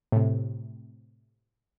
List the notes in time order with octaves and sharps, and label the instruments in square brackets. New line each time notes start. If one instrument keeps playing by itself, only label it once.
[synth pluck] A2 C3